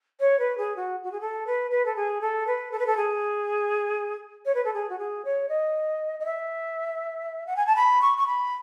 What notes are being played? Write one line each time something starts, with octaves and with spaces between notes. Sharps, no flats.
C#5
B4
G#4
F#4
F#4
G#4
A4
B4
B4
A4
G#4
A4
B4
A4
B4
A4
G#4
C#5
B4
A4
G#4
F#4
G#4
C#5
D#5
D#5
E5
F#5
G#5
A5
B5
C#6
C#6
B5